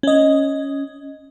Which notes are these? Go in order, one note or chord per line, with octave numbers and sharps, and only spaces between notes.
C#4 D#5